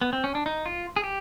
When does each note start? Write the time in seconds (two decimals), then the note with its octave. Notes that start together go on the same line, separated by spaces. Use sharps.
0.01 B3
0.13 C4
0.24 C#4
0.35 D4
0.46 D#4
0.66 F4
0.96 G#4
1.04 G4